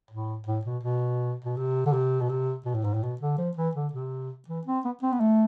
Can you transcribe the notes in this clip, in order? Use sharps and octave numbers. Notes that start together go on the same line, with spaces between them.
A2
A2
B2
B2
B2
C3
D3
C3
B2
C3
B2
A2
G#2
A2
B2
D3
F3
E3
D3
C3
E3
C4
B3
C4
B3
A3